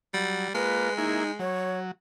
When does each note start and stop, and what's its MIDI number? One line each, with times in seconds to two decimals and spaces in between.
0.14 0.48 54
0.14 0.51 55
0.54 1.42 56
0.54 0.90 58
0.54 0.90 65
0.54 0.93 71
0.98 1.24 58
0.98 1.31 63
0.98 1.24 64
0.98 1.24 68
1.39 1.91 54
1.39 1.78 73